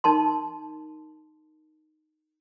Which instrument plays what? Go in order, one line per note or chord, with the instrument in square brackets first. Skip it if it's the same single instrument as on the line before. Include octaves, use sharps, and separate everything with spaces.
[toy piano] D#4 A#4 A5 C6